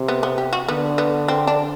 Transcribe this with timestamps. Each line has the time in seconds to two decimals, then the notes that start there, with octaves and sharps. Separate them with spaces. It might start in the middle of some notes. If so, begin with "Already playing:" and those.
Already playing: C3
0.08 B3
0.23 B3
0.38 G4
0.53 F#4
0.68 D3 B3
0.98 B3
1.28 C4
1.47 D4